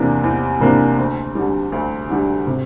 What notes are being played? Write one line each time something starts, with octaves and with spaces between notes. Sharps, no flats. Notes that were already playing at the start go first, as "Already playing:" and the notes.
Already playing: E2 C3 E3 A#3 D4
E2
C3 E3 A#3 D4
D2
D3 G3
D2
D3 G3
C3